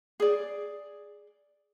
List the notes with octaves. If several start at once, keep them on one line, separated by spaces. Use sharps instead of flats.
G#4 D5